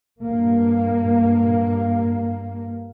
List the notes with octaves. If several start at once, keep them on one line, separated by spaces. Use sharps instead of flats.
G2 A#3